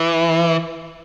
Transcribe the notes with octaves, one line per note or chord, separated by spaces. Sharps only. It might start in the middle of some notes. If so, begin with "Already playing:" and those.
Already playing: E3